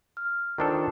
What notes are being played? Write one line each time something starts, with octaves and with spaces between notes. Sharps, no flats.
F6
D#3 D4 F4 A4 C5